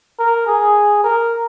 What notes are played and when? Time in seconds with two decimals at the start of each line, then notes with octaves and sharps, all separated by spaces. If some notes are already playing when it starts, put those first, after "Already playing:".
0.19 A#4
0.47 G#4
1.04 A#4